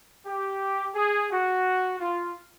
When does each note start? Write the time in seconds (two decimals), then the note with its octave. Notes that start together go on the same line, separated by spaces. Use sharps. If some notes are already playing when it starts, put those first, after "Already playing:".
0.25 G4
0.95 G#4
1.31 F#4
2.00 F4